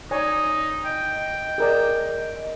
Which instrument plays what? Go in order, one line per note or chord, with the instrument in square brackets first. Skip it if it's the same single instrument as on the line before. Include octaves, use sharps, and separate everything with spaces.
[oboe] D#4 [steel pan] C#5 D5 G#5
[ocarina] D#5 [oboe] G5
[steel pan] G#4 A#4 D5